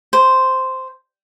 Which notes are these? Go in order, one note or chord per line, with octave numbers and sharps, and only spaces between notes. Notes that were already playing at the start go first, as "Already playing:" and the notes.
C5